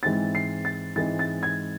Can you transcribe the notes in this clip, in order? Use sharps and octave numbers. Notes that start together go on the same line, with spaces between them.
G#2 E3 G#3 C4 D#4 A6
C7
A6
G#2 E3 G#3 C4 D#4 A6
A6
G#6